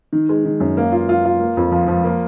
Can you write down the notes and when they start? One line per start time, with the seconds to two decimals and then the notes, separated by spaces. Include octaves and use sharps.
0.13 D#3
0.29 G#3
0.45 D#3
0.60 F#2
0.77 A#3
0.92 F4
1.09 F4
1.25 F4
1.40 A#3
1.57 F2
1.72 F3
1.88 F3
2.04 A#3